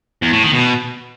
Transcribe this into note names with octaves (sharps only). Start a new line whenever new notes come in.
E2
A2
D#3
B2